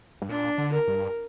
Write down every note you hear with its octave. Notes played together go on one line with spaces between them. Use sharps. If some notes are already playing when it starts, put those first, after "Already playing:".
G2
A#2 D4
D3
A#4
G2